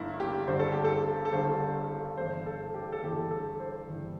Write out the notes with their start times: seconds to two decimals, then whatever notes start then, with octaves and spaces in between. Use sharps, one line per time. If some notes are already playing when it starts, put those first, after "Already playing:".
Already playing: G1 G2 D3 E4
0.20 G4
0.47 G1 G2 D3 G3 C5
0.59 A4
0.72 G4
0.84 A4
1.25 A4
1.32 G1 G2 D3 G3 C5
1.76 A4
2.17 G1 G2 E3 C5
2.46 A4
2.74 G4
2.92 A4
3.03 G1 G2 E3 G4
3.31 A4
3.60 C5
3.87 G1 G2 E3